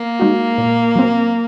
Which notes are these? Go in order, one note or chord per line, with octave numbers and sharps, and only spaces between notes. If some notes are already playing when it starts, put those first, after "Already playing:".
Already playing: A#3
G#3 D#4 F#4
A#2
F#3 C4